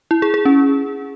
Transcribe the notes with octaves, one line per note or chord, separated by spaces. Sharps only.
E4
G#4
G#4
C#4